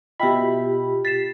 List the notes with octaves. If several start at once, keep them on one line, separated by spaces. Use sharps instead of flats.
B2 F4 G4 D#5 E5 G5 B5
A6 B6 C7 E7